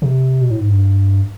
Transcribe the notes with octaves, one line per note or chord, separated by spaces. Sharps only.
C3
B2
A2
G#2
G2